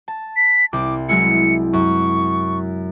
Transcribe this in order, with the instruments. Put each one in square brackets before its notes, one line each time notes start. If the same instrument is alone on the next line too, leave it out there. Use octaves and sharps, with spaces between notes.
[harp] A5
[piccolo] B6
[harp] C2 [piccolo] D6
[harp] F#3 G#3 E4 [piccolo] C#7
[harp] F#2 [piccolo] C#6